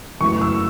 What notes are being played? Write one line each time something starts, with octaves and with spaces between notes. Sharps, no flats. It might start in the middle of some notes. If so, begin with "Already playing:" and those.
F#2 E3 A3 C#6
E6